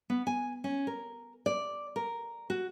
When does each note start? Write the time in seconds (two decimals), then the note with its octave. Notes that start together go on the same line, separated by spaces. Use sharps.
0.10 B3
0.27 G#5
0.64 C#4
0.87 A#4
1.46 D5
1.96 A#4
2.50 F#4